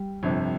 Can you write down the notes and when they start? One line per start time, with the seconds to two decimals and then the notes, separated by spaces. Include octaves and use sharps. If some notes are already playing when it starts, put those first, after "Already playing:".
Already playing: G3
0.23 G1 F2 C3